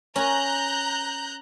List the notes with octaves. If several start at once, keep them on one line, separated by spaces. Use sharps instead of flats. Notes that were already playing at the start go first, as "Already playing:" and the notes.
C#4 G#5 A#5 F#6 G6